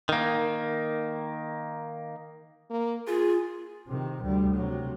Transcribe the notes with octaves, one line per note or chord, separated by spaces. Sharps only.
D#3 A#3
A#3
F4 G#4
C3 D#3
D2 G3
C3 F#3